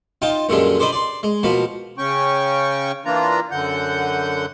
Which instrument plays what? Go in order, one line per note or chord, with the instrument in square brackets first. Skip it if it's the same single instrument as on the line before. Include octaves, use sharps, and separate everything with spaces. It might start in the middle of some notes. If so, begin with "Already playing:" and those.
[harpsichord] D#4 F4 G5 A5
F#2 A#2 D3 G3 G#3 D4
D4 C5 D5 D#5 B5
D5 C6
G#3
B2 F3 A#3 B5
[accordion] C#3 C#4 G5 C#6
E3 A#3 D4 F4 A#5
F#2 D3 F#5 G6